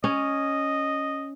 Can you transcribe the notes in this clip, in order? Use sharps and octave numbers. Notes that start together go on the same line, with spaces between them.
C#4 D#5